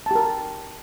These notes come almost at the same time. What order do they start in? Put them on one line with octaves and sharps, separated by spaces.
A5 G4 A#4